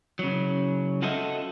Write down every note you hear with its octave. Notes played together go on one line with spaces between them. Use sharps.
C#3 F#3
F4 F#4 A4 C5 D#5 E5